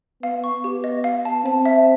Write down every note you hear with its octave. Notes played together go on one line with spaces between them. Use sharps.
B3 F5
C#6
B3 G4
D#5
F5
A5
C4 A5
E5